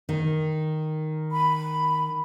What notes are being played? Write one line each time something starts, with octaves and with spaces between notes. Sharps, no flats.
D#3
B5